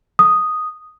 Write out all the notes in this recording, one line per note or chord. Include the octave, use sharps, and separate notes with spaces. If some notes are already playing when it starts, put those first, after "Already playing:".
D#6